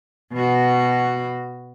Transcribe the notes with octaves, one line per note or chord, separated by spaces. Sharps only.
B2 F#4